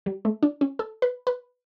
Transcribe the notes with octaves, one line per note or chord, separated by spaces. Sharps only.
G3
A3
D4
C#4
A4
B4
B4